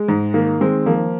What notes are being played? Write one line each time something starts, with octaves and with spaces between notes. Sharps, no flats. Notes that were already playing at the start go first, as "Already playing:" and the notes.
Already playing: G#3
G#2
D#3 A#3
D#3 G#3 C4
F3 A#3